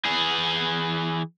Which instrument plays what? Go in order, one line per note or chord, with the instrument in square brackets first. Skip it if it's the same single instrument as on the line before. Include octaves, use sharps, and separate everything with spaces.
[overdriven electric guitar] E3 G#4